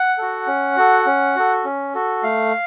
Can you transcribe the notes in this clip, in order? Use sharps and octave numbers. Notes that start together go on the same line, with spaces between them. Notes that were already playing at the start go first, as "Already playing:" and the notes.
Already playing: F#5
F#4 A4
C#4
F#4 A4
C#4
F#4 A4
C#4
F#4 A4
A3 F5